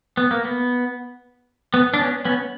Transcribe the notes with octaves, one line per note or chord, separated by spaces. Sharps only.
B3
A#3
B3
B3
D4
B3 C#4
B3 C#4